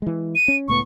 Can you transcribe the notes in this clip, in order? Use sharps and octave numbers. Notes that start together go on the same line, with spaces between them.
E3 G#3
D#7
C#4
C#2 A2 B3 C#6